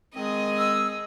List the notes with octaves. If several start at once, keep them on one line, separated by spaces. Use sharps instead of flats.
D#3 G#3 C4 G#4 D#5
E6